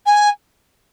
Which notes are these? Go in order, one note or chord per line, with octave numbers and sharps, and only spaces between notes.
G#5